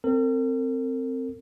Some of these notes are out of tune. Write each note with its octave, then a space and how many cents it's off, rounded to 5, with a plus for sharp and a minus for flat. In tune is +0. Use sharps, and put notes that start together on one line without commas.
C4 +0 A#4 -45